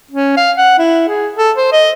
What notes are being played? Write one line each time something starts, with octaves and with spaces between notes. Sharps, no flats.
C#4
F5
F#5
E4
G#4
A4
C5
D#5